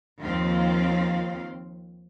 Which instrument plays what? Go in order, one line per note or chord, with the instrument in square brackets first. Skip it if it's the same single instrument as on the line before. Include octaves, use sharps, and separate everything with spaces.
[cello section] D#2 F3 C4 F5